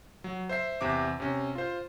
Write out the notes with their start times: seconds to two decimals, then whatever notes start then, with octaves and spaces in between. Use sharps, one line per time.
0.24 F#3
0.49 C5 E5 C7
0.81 E2 C3 E5 D6
1.20 C3 C#4
1.55 F4 C5